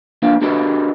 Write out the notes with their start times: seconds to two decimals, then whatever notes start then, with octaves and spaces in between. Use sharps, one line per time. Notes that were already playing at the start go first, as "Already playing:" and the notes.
0.22 A#3 D4 F4 B4 F5
0.41 D4 F#4 G4 A4 B4 D#5